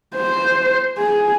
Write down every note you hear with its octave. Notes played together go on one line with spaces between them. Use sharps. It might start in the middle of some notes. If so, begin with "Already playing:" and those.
C5
G#4